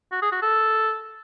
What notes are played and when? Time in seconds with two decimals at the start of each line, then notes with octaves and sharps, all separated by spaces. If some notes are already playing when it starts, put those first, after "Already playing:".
0.12 F#4
0.22 G#4
0.32 F#4
0.42 A4